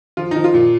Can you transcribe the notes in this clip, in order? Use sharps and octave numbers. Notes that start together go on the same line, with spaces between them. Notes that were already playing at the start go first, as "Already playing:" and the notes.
F3 F4
F3 D#4
F4
A#2